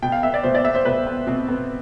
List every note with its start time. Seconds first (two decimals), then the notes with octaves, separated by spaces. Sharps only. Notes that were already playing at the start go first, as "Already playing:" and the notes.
0.02 B2 G5
0.12 F5
0.23 B3 E5
0.34 D5
0.43 B2 C5
0.55 D5
0.64 B3 E5
0.75 C5
0.85 B2 B4
1.06 B3
1.27 B2 C4
1.48 B3